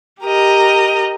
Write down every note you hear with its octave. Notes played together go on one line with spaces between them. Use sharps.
G4 A#4 D#5